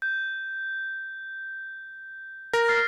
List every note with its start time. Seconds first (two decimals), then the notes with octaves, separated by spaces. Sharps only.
0.02 G6
2.53 A#4 A#6
2.68 F6 A6 C7